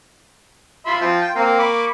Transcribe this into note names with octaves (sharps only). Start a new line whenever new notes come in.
F4 E5 B5 C6
F3 C4
G5
A#3 C4 F5 A#5
B5 C#6 D6